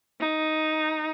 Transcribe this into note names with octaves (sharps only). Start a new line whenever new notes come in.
D#4